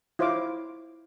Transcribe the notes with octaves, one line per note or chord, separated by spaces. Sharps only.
E4 F4 C5 C#5 F5 D6